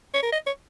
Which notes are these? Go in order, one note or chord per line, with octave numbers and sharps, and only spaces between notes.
C#5
A#4
D#5
C#5